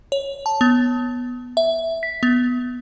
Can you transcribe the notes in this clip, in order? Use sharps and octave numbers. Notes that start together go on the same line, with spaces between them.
C#5
A5
B3
E5
B6
B3